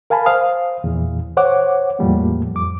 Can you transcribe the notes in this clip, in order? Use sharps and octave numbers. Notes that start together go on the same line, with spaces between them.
A#4 F5 G#5 A5 B5
C5 F5 D#6
E2 A#2 E3
C5 C#5 F#5 D6
E2 A2 F3 G3 A#3
F2 D6